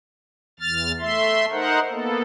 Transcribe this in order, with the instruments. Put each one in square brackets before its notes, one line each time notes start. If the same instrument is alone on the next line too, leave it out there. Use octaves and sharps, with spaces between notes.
[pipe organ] E2 F6 A6
A3 E5 C6
D#4 A#4 C5 F#5
A#3 B3 A4